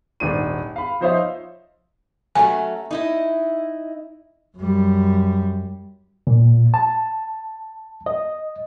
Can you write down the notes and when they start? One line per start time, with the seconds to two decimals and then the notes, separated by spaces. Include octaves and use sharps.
0.20 D#1 G#1 D4 D#7
0.76 F5 B5
1.01 F3 D#4 C5 C#5 E5 F5
2.35 F#3 A3 C#4 G#5
2.91 D#4 E4 D#5
4.57 F#2 G3
6.27 A#2
6.74 A5
8.06 D#5